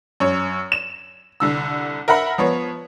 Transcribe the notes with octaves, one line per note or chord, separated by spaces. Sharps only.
F#2 C#5
E7
C2 D3 E6
A#4 E5 F#5 A#5 B5
F3 B3 C#5